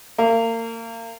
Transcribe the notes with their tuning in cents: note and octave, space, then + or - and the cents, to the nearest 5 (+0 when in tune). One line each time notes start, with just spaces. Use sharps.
A#3 -35